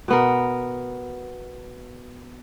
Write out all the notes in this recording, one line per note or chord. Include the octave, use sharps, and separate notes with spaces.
B2 B3 A#4